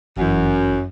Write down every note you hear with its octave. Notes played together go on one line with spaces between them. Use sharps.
G1 F#2 E3